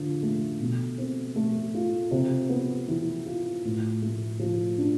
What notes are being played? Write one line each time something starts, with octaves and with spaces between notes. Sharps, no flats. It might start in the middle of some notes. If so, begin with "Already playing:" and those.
Already playing: D3 F3
A3
B2
C4
A3
F4
C3
B3
E3
F4
A2
A3
F3
D4